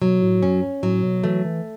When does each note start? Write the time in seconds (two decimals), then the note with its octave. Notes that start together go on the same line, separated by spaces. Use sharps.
0.01 B2 F#3
0.21 A2
0.43 F#2 C#4
0.83 A2 F#3
1.03 B2
1.24 E3 A3
1.45 E3